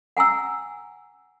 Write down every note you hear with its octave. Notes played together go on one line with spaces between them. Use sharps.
F#5 G#5 A#5 E6